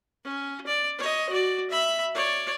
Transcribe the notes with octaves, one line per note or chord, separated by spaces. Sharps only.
C#4
D5
C#5 D#5
F#4 D5
E5 B5
C#5 D5